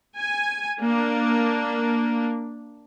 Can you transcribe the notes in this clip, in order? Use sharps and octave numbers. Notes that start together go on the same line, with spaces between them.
G#5
A#3 D4